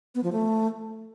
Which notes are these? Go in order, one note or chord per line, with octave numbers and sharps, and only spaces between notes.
B3
F3
A3